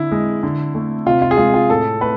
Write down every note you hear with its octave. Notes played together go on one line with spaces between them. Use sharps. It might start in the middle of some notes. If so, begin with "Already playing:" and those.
Already playing: D3 E4
G#3
D3
A3
C3 F4
F4
G#4
G#3 F4
F4
A2 A4
A3 B4